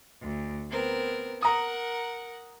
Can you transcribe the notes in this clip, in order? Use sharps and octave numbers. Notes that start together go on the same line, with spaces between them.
D2
B3 C4 A#4
A#4 F#5 A#5 D#6